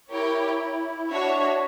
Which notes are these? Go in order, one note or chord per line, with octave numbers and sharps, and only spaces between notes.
E4 G4 A#4 C#5 G5
D4 F#4 C#5 E5